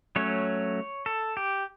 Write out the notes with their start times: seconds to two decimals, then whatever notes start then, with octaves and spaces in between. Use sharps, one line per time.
0.16 F#3 A3 C#4 C#5
1.06 A4
1.37 G4